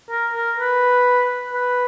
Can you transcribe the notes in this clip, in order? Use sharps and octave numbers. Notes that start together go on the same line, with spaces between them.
A#4
A#4
B4
B4